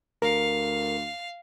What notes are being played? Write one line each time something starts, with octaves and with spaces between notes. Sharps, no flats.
D2 A#4 F5